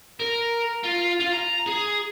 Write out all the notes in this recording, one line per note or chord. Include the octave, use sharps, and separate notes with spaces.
A#4
F4
F4
A#5
G#4